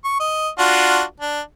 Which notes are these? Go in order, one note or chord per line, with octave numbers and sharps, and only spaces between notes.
C#6
D#5
D4 F4 F#4
D4